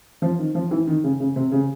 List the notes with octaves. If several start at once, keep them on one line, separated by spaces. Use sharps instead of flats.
F3
D#3
F3
E3
D#3
C#3
C#3
C3
C#3